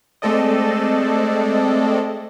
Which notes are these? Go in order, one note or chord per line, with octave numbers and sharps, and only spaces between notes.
G#3 A3 C4 A4 D5 D#5